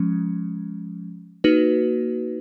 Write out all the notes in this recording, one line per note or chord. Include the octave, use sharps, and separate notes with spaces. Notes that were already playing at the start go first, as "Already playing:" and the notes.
Already playing: F3 G#3 C#4
A#3 D#4 F#4 B4